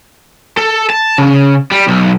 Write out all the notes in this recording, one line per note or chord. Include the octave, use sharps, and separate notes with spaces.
A4
A5
C#3
G3
B1